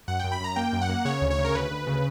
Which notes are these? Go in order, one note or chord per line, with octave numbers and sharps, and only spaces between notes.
F#2 F#5
F#2 G5
B5
F#2 A#5
A#3 G5
F#2
F#5
A#3
C#3 C#5
D2
C#5
C#3
A#4
D2 B4
D2
C#3